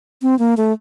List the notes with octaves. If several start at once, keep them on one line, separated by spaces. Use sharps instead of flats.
C4
A#3
A3